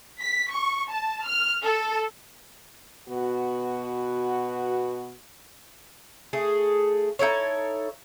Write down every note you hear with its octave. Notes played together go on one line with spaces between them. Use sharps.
B6
C#6
A5
F6
A4
B2 B3 F#4
A3 G#4
D#4 E4 A4 C#5